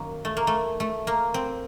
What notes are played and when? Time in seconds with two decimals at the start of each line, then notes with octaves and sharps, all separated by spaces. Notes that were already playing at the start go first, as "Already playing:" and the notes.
Already playing: F#2 D#3 F#3 A#3
0.25 A3
0.37 A#3
0.47 A3
0.80 A3
1.07 A#3
1.34 C4